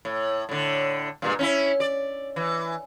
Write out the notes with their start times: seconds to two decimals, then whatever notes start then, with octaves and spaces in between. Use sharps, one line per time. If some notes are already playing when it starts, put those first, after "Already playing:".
0.05 A2
0.49 A2 D3
1.22 G2 A#2 G#3
1.39 C#4 D#4 E4
1.80 D5
2.36 E3